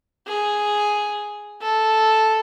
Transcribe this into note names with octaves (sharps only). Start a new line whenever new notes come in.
G#4
A4